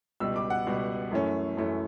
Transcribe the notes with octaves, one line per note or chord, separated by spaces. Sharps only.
C#2 B2 G3 E6
D6
F#5
C#2 B2 G3
F#2 E3 A3 C#4
F#2 E3 A3 C#4